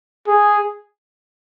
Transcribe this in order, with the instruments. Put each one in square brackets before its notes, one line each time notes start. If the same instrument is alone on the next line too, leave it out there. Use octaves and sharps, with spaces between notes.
[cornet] G#4